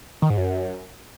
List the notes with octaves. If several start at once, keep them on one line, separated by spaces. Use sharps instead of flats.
D#3
G#2
F#2